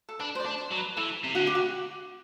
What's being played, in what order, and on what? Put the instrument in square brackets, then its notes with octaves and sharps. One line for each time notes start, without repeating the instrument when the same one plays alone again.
[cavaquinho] A4
[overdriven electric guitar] D4 [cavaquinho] B4
[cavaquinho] C5
D5
[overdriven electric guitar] D4
[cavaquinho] C5
[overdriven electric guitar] F#3
[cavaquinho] B4
[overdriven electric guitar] E3 [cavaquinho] A4
[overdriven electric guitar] C3
[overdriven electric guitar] D3 [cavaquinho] F#4
[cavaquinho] G4
F#4